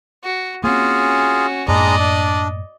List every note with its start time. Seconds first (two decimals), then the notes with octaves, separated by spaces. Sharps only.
0.24 F#4
0.64 A#3 C4 C#4 F4 F#4 G#4
1.68 F#2 A2 G#3 A#3 D4 D5 D#5 A#5
2.00 D4